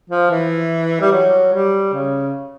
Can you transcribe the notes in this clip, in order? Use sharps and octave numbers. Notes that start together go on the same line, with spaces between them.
F3
E3
G3
F#3
G3
C#3